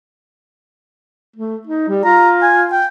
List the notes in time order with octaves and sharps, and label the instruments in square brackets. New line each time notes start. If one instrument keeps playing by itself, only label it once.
[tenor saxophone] A3
D#4
G3
[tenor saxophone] F4 [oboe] A#5
[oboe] G#5
G5